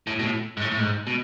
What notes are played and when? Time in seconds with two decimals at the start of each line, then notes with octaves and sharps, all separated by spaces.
0.07 A2
0.19 B2
0.24 A2
0.57 G#2
0.61 A2
0.71 A2
0.79 G#2
1.07 B2